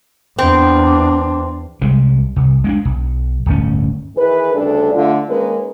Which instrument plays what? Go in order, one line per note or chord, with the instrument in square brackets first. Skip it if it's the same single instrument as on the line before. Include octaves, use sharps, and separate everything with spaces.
[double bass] E2 D4 [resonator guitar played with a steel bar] C4
[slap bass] C2 G3 G#3
C2
G#3 C4 D4
B1
D1 G1 A3 C#4
[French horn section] D#3 E3 G#4 B4
D2 C#3 G3 D4 A4
D3 A3 F4
D#3 G#3 A#3 C#4 A#4 B4